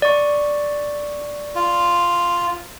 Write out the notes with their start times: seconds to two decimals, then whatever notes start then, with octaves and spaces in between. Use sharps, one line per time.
0.02 D5 C#6
1.56 F4